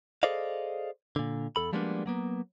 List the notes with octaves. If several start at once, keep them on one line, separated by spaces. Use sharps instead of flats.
G#4 A4 C5 D5 D#5 F5
A#2 D3
E2 A4 B5
F3 G3 G#3 A#3 B3 D4
F#3 A#3 B3